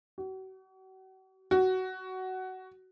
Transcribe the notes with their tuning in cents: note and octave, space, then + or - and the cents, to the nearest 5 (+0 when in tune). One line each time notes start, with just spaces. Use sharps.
F#4 +40
F#4 +15